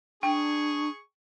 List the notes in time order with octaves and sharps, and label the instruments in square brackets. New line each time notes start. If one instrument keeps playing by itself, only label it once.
[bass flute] D4 [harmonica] G#4 C#6 [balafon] G5